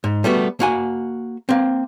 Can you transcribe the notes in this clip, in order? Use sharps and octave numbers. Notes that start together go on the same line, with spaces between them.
G#2
G3 A3 B3 F#4
A#3 F#4 G#5
A#3 C4